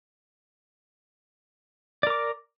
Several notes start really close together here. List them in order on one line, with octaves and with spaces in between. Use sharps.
D5 A#4 D6